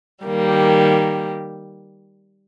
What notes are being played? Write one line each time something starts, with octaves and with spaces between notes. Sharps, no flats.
D#3 G3 A#3 G4